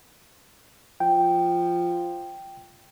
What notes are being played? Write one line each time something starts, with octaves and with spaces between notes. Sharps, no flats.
F3 G5